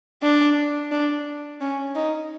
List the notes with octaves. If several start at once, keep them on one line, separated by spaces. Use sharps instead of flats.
D4
D4
C#4
D#4